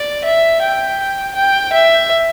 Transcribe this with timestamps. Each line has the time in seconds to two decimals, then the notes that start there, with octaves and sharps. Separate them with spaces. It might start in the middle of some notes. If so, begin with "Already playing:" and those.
Already playing: D5
0.24 E5
0.61 G5
1.35 G5
1.72 E5